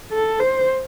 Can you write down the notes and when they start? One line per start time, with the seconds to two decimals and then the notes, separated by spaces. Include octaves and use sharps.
0.12 A4
0.40 C5